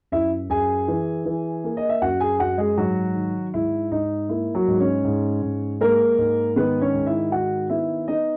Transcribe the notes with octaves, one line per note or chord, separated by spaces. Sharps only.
F#2 E4 E5
F#2 G#4 G#5
E3
E3
A#3
D#5
E5
F#2 F#4 F#5
G#4 G#5
F#2 F#4 F#5
G#3 G#4
G#2 F#3 F#4
D#3
G#2 E4
G#2 D#4
A#3 E4
F#3 F#4
G#2
C#4 C#5
G#2
G#2
G#3 A#3 A#4
G#2
D#3 B3 B4
C#4 C#5
G#2
E4 E5
D#3 F#4 F#5
B3 E4 E5
B3 D#4 D#5